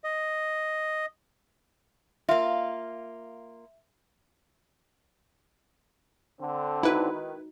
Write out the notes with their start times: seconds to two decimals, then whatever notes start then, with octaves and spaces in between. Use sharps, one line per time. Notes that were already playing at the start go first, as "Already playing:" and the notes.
0.04 D#5
2.29 A#3 F4 E5
6.41 D3 C4
6.83 D#4 E4 F#4 B4
7.13 D#3